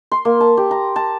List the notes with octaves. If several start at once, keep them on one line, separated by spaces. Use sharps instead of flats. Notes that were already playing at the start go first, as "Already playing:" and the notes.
C6
A#3
A5
G4
A#5
A5